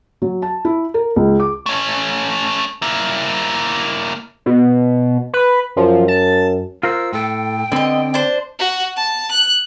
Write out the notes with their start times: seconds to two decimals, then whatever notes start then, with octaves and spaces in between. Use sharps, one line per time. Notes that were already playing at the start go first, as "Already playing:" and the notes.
0.22 F#3
0.42 A5
0.65 E4
0.94 A#4
1.16 C#2
1.40 D6
1.66 A3 C#4
2.82 A#3 E4
4.46 B2
5.34 B4
5.77 F#2 F3
6.08 A5
6.83 F4 A#4 C5 E6
7.13 A2 A4 G5
7.72 D3 B3 C4 D#5
8.14 D4 C5
8.59 F#4
8.97 A5
9.32 F#6